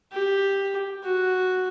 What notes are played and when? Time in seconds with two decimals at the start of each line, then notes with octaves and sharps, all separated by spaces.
0.12 G4
1.04 F#4